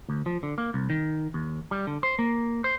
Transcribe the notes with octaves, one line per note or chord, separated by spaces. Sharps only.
D2
F3
D3
A#3
C2
D#3
D#2
G3
D3
C5
A#3
C5